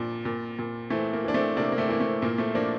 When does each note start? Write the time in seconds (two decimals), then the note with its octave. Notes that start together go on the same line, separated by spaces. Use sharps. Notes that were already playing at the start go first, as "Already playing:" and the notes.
Already playing: A#2 F3 A#3 D4
0.25 A#2
0.59 A#2
0.90 E3 A3 C4
1.13 A#3
1.24 E3 D4
1.34 A3 C4
1.56 C3 A#3 D4
1.72 A#3
1.78 A3 C4
1.89 E3 A#3
2.00 A3
2.22 A#2 A#3
2.38 A3 C4
2.55 F3 A#3 D4